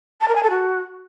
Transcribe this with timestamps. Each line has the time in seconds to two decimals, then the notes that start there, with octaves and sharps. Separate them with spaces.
0.20 A5
0.28 A#4
0.35 G#5
0.42 A4
0.50 F#4